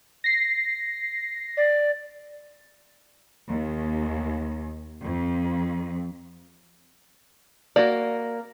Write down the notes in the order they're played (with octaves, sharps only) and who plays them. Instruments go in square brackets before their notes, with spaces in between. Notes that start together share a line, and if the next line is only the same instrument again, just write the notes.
[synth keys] A#6 C7
[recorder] D5
[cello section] D#2
F2
[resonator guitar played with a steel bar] A#3 [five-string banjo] F#4 D5